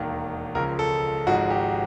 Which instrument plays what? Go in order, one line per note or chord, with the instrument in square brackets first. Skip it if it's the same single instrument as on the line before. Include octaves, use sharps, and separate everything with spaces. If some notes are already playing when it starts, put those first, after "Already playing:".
Already playing: [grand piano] E1 D#2 D#3
C#2 C#3 F3 A#4
A4
G#1 G#2 F3 G#3 F#4
G4